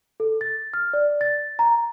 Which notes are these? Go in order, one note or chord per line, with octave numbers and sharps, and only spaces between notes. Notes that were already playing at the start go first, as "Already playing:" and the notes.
A4
A6
F6
D5
A6
A#5